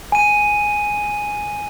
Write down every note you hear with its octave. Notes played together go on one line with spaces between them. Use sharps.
G#5 D#7